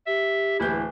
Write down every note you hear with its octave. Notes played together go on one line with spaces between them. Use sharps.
G4 E5
D1 E3 E4 G6